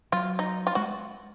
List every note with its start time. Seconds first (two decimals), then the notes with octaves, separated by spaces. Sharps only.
0.12 F#3 F4
0.39 D#4
0.67 F4
0.75 G#3 F#4